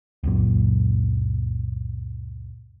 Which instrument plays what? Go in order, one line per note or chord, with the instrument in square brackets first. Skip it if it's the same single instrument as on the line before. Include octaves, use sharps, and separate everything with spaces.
[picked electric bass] C#2 F#2 A#2